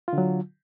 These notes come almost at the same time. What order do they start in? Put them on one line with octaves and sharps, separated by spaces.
F4 D3 F#3